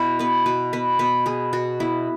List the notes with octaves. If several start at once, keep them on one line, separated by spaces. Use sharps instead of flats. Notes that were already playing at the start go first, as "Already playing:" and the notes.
Already playing: B2 E4 F#4
B3 B4
B2 B4
B3 B4
B2 B4
B3 G#4
B2 F#4
B3 E4